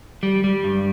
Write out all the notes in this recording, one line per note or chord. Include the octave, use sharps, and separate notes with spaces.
G3
G3
G2